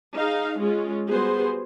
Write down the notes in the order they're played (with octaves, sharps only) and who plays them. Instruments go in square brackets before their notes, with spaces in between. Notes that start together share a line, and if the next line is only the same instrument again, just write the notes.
[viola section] D#4 G#4 F5
G#3 C#4 F4
G3 B3 F#4 G#4 C5